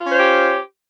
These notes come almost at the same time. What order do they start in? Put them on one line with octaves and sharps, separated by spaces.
F4 C#4 C5 C#5 G4